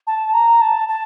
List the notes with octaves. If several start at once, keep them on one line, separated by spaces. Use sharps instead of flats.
A5
A#5
A5
A5